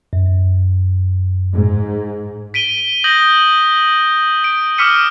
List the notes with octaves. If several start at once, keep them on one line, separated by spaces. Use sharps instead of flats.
F#2
G#2
B6 D7 D#7 G7
D#6 G6 A#6 F#7
D7
D6 E6 F6 B6 C#7 D#7